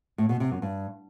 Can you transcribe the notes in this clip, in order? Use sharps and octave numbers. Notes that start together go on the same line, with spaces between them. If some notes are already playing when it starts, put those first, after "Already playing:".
A2
B2
C3
F#2
G2